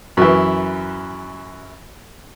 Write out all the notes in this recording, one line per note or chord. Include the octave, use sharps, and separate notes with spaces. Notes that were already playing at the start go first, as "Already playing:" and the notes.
F#2 E3